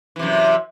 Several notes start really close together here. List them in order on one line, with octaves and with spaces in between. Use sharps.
E3 C3 F#2